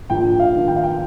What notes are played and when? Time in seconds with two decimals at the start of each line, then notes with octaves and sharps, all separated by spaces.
0.10 A#1 G5
0.39 F5
0.54 D#3
0.68 G5
0.76 F5
0.83 G5